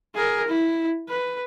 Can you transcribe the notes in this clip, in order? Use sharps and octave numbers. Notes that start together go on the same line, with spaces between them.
G#4 A#4
E4
B4